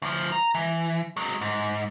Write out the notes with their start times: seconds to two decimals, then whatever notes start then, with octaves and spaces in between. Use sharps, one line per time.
0.02 D2 F3
0.32 A#5
0.55 E3
1.17 F#3 G#3
1.41 G#2